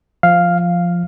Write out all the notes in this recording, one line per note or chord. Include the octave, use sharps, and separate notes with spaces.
F3 F5